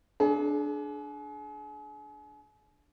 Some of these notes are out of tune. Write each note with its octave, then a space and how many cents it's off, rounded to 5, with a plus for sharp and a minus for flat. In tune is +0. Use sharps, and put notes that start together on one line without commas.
D4 +0 G#4 +35